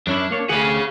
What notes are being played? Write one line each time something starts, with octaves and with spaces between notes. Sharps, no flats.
F#2 C#4 D4 E4
A#3 C#5
D2 G4 G#4 F5 F#5